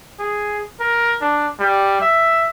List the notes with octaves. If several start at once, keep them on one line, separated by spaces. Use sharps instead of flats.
G#4
A#4
D4
G3
E5